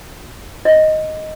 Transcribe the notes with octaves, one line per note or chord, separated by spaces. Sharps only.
D#5